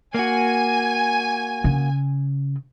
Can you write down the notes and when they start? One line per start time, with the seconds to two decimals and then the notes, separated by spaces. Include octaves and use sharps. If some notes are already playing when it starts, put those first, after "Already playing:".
0.14 A#3 F#4 G#5
1.64 C#3